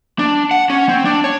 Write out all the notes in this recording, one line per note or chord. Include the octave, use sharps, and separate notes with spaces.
D4
F#5
C#4
C4
D4
C#5